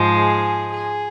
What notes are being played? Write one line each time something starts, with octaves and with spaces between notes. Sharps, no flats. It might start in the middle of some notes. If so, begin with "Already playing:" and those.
Already playing: G#2 F3 G#3
G#4
G#4